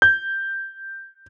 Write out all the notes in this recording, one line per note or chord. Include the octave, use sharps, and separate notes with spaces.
G6